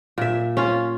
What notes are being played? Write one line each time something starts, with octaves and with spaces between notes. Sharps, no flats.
A#2 E5
C#4 F4